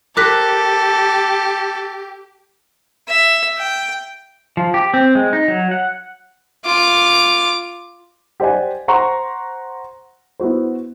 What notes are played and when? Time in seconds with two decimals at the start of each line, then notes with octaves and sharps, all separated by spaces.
0.17 G4 A4 A#4 C5 D6 F#6 B6
3.09 E5
3.58 G5
4.57 F3
4.74 G4
4.94 C4
5.15 G#3
5.33 D#4
5.48 F#3
5.71 F#5
6.65 F4 D6
8.40 G4 C5 D5 F#5 G#5
8.88 C5 F#5 A#5 C6 C#6
10.40 B3 E4 F#4 C5